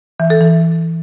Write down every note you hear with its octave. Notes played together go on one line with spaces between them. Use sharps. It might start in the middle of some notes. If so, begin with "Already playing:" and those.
E3
A4
E3